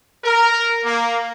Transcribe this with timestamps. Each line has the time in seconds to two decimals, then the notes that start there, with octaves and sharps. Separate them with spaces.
0.24 A#4
0.84 A#3